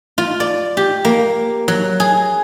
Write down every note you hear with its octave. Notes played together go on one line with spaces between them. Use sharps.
F4
D5
G4
A#3
F#3
G#4